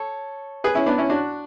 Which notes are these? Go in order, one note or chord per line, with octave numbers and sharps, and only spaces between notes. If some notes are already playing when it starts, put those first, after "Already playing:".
Already playing: A4 C#5
G#4 B4
C#4 E4
B3 D4
C#4 E4
D4 F#4